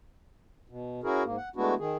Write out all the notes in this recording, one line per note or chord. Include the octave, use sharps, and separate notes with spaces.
B2
C#4 E4 F#4 G#4 A#4
G#2 A#3
F#5
G#3 A3 B3 D4 E4 F#4
D#3 G#4